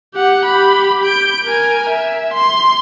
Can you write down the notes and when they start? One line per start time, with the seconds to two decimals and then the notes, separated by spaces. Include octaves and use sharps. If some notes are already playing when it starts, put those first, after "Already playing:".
0.14 G4 F#5
0.46 G4 B5
1.03 G6 D7
1.44 A#4 G#5
1.90 E5
2.34 C6